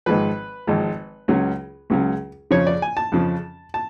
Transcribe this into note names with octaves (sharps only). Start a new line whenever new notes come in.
G#1 G#2 F3 B4
G#1 G#2 F3
C#2 C#3 F#3 C#4
C#2 C#3 F#3 C#4
F2 C#3 F3 C#5
D5
G#5
A5
F2 C#3 F3
A5